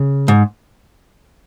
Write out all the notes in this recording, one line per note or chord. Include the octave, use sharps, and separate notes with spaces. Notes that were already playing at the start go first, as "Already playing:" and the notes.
Already playing: C#3
G#2